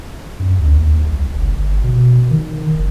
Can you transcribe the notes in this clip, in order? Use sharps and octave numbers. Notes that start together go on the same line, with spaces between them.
F#2
D2
D#2
C2
F#1
G1
B2
D#3
F#1